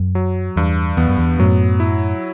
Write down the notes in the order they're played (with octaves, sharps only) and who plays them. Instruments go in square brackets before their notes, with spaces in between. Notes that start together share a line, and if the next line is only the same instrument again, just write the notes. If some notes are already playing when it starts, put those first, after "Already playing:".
Already playing: [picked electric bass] F#2
[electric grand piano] F#3
[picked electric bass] E2 [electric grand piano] G2
[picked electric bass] E2 [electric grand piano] B3
[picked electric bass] F#2
E2
[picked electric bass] F#2 A2 [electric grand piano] F#3
[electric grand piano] E4